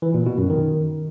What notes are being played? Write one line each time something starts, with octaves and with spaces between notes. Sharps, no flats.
E3
A#2
B2
F#2
D#3